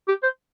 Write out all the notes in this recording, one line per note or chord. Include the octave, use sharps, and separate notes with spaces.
G4
C5